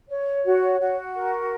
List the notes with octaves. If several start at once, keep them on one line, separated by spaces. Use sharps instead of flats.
C#5
F#4
F#4
A#4